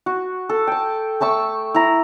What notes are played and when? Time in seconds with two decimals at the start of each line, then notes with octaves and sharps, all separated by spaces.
0.06 F#4
0.49 A4
0.67 G5 A5
1.21 A3 A5 C#6 E6
1.74 E4 A#5